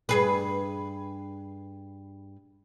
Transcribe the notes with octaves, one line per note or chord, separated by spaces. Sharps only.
G2 G#4 B4